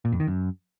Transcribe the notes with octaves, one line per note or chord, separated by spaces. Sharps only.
A#2
F2
D#3
F#2